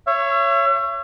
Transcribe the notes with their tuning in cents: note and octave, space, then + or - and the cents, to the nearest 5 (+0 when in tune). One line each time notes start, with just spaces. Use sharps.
C#5 +0 E5 +40